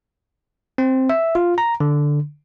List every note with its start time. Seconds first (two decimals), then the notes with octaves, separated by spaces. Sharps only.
0.78 C4
1.10 E5
1.35 F4
1.58 A#5
1.80 D3